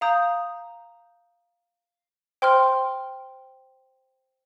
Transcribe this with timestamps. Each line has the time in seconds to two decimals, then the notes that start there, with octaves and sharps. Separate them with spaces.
0.01 F5 A#5 D#6 G6
2.42 C5 G5 C6 F6